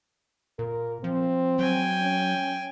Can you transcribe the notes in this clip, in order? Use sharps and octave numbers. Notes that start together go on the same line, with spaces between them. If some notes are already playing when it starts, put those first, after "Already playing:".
A#2 A#4
F3 C4
F#3 G5 G#5
C#4